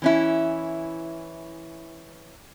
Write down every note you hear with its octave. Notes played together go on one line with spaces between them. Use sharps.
E3 C#4 E4